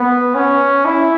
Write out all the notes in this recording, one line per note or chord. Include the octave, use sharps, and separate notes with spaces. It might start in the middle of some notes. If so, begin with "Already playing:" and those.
Already playing: B3
C#4
E4